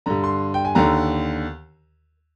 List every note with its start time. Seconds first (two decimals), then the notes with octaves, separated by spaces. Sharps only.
0.06 G2 D3 A#5
0.24 C6
0.54 G5
0.65 G#5
0.75 D#2 D3 A#5